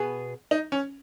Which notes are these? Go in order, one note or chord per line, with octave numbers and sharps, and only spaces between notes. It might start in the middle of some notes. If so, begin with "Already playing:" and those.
Already playing: B2 B3 G#4
D#4
C#4